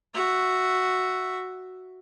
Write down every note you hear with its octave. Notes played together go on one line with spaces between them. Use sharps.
F#4 E5